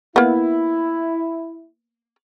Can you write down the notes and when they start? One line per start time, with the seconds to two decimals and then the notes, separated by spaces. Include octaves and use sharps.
0.16 A#3 B3 E4